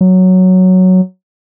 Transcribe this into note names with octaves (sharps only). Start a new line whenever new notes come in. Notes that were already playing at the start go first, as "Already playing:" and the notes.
F#3